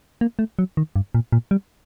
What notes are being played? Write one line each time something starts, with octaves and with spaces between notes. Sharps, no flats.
A#3
A3
F#3
D#3
G2
A#2
A#2
G3